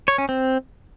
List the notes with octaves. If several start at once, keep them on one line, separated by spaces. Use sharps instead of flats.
C#5
C#4
C4